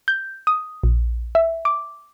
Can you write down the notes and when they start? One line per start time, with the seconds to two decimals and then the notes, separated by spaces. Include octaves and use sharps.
0.08 G6
0.47 D#6
0.84 A#1
1.35 E5
1.65 D6